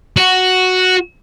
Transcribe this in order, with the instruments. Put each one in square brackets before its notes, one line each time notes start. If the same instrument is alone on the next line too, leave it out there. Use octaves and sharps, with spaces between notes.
[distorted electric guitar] F#4